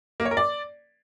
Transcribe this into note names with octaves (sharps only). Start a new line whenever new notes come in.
A#3
C#5
A#4
D5